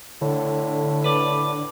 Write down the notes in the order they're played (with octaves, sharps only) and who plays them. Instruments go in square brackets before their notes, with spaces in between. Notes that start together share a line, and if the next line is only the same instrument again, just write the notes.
[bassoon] A2 [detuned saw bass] D3
[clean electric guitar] B4 D5